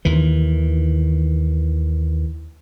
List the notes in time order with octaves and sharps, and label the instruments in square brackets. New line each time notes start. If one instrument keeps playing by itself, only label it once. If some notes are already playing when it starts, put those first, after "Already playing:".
[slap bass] D#2 D#3 E3